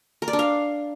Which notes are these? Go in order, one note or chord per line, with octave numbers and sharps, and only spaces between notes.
A#4
D5
D4
F5